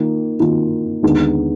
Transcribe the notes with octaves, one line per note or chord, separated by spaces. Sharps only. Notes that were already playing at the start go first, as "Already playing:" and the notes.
Already playing: D#3 A#3 F4
D#3 A#3 F4
D#2 D3 G#3 B3 D#4